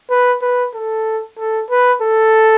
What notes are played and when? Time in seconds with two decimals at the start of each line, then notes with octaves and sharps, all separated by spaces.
0.10 B4
0.42 B4
0.74 A4
1.38 A4
1.71 B4
2.02 A4